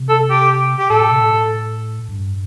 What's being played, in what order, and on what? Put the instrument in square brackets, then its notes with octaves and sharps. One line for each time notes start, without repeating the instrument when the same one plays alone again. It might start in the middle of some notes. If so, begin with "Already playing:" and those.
Already playing: [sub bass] C3
[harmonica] A4
G4
G4
[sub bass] A2 [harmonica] A4
[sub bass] C3
A2
G2